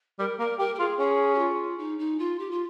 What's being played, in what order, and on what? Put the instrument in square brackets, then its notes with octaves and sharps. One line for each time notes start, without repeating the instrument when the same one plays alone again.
[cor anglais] G3 [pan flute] A#4
[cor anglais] A#3 [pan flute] A#4
[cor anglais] G4 [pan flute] A#4
[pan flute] A#4
[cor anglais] F4 [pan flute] G#4
[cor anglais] C#4 [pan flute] G#4
[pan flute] G4
F4
D#4
D#4
F4
G4
F4